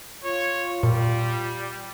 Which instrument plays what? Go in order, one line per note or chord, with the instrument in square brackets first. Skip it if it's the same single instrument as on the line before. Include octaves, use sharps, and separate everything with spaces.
[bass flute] F4 [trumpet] C#5
[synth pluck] A#2 [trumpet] G3